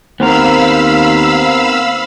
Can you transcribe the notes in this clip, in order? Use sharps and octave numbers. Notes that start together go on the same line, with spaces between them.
D#2 B3 C4 A#4 F5 B5 E6